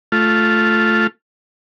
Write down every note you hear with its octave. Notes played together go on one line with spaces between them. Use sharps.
A3 F4